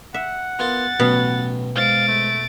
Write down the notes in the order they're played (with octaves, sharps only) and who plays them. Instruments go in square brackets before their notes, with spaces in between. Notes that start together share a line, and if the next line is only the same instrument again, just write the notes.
[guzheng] E5 [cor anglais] F#5
[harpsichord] B3 F4 A#4 [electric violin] A6
[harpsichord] A1 F#3 B3 [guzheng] B2
[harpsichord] G#2 [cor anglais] F5 [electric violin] A6 D7
[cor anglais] A3